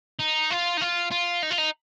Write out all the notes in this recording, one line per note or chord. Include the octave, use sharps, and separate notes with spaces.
D#4
F4
D#4
F4
F4
D#4
F4
D#4